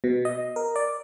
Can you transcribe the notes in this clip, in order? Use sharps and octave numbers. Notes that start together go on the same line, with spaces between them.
B2
D#5
A#4
D5